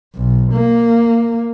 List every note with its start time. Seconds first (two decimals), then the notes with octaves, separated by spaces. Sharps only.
0.15 B1
0.53 A#3